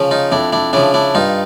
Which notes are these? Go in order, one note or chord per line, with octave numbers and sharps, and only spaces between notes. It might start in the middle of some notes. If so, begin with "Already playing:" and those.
Already playing: C#3 F3
D#4 F4
F2 D4 E4
D4 E4
C#3 F3 D4 E4
D4 E4
G2 D#4 F4